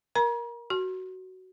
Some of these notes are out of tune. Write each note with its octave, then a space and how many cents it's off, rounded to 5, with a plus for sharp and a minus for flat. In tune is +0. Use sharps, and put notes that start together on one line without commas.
A#4 +10 A#5 +40
F#4 +10 C6 +40